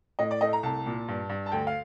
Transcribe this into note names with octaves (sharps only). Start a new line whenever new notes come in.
A2 D#5
D5
A3 D#5
A#5
C2 A5
A#2
G2
G2
A5
D2 G5
F5